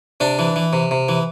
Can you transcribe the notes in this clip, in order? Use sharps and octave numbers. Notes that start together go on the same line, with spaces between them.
C3 D4
E3
E3
C3
C3
E3